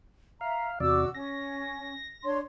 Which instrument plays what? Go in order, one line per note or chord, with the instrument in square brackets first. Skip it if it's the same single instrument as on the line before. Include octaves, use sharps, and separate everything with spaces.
[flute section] E5 A#5 [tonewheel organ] F5
[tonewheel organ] E2 C3 D5 [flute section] F#4 D6 E6
[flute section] C#4 [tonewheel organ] A#6
[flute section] D4 C#5 C6